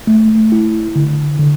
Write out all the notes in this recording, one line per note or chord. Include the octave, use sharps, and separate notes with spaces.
A3
E4
D3
D3